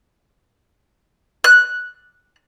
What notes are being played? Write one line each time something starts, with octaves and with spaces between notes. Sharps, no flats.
F#6